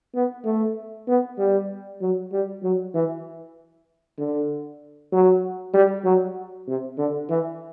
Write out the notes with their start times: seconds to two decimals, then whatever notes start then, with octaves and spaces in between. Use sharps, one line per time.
0.15 B3
0.45 A3
1.08 B3
1.38 G3
2.01 F#3
2.32 G3
2.63 F#3
2.95 E3
4.19 D3
5.12 F#3
5.74 G3
6.04 F#3
6.68 C3
6.98 D3
7.30 E3